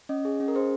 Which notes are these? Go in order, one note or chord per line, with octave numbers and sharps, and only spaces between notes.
C#4 D#5
G#4
C#4
A#4
G#4 C5